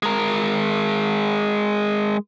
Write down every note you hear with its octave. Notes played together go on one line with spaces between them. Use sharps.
G#3 A#4